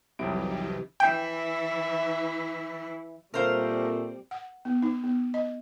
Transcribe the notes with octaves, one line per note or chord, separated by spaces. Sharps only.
C2 F2 C3 E3 F#3 D#4 G4 D7
E3 E4 E5 G5
A#2 G3 A3 C4 A#4 C5 F5
F#5
B3
D#4
B3
D#5